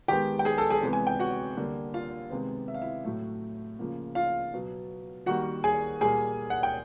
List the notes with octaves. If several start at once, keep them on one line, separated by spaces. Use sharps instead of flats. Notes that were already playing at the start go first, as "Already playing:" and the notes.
D#3 G#3 B3 G4 G5
G5
G#4 G#5
A4 A5
G#4 G#5
C3 E3 G#3 B3
G#5
G5
F#4 F#5
D3 G3 A#3
F4 F5
C3 D#3 G#3 B3
E5
F5
E4 E5
A2 F#3 A3
C#3 F3 A#3
F4 F5
B2 F#3 B3
D#3 G3 A#3 F#4 F#5
G#4 G#5
A#2 G3 A#3 G#4 G#5
F#5
G5